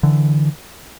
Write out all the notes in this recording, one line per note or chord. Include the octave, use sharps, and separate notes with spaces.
D3 E3